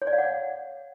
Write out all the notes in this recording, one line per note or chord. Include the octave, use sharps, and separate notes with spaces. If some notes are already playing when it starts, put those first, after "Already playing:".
C#5
D5
F5
F#5